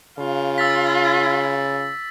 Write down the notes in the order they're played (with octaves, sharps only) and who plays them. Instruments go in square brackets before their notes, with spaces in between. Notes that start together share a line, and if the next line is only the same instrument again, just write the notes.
[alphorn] C#3 [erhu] F4
[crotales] E6 A6 B6